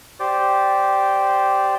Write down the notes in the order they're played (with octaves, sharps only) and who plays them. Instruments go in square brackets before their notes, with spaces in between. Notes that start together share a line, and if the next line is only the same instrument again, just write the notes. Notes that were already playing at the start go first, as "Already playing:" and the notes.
[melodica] G4 C5 D5